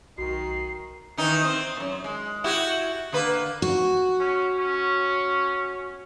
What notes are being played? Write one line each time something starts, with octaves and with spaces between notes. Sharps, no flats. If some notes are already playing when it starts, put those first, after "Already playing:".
B1 D#3 F#4 C7
D#3 E3 D#4
C4
F#2 A#2
G#3
E4 F#4 G4
D3 A#3 B4
F#4
C#4
C#4